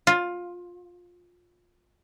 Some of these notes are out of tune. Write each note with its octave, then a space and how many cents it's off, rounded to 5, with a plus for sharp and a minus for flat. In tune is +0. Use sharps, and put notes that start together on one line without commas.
F4 +15